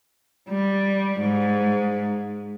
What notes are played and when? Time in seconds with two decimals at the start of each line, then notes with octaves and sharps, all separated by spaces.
0.49 G3
1.20 G#2